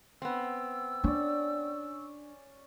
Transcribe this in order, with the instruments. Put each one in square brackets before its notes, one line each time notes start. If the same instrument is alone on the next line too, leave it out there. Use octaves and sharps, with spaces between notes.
[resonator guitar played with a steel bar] B3 C4 [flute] E6
[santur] C#4 D5 [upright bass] D4